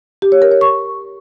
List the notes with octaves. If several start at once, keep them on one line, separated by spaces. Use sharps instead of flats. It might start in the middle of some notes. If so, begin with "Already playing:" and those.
G4
C#5
A#4
C#5
C#6